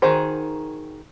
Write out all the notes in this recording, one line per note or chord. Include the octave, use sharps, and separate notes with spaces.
D#3 D#4 F#4 G#4 C5